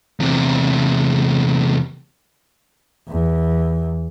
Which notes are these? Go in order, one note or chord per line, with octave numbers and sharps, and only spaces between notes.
E2 C3
E2